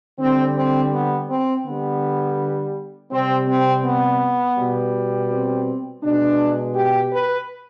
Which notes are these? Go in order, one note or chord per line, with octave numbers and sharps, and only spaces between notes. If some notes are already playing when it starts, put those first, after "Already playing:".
D3 G3 C4
C4
B3
C4
D3 B3
G3
C3 G3 C4
C4
B3
B2 G3
C4
B2 G#3 D4
G4
B4